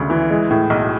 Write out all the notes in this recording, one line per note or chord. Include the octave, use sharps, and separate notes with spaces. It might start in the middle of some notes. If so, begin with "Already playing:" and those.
Already playing: D2 C#3 G#3
E3
G#3
A2
B1